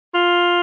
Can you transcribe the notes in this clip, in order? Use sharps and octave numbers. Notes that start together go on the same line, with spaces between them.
F4